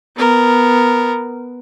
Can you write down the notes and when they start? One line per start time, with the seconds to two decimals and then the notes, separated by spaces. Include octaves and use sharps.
0.16 B3 A#4